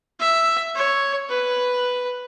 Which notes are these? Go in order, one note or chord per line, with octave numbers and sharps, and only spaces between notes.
E5
C#5
B4